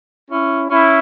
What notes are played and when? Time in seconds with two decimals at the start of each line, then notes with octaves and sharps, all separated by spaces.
0.30 C#4 E4
0.70 C#4 E4